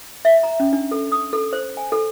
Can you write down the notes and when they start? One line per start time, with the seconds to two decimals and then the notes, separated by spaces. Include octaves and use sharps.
0.25 E5
0.43 A#5
0.60 C#4
0.73 D4
0.91 A4
1.12 D#6
1.33 A4
1.53 C5
1.77 G#5
1.92 A4